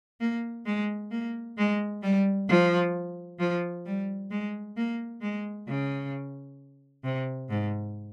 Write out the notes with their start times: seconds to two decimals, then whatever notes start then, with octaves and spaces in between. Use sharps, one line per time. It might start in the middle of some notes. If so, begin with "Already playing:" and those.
0.20 A#3
0.66 G#3
1.11 A#3
1.58 G#3
2.02 G3
2.49 F3
3.39 F3
3.86 G3
4.31 G#3
4.77 A#3
5.22 G#3
5.68 C#3
7.04 C3
7.50 G#2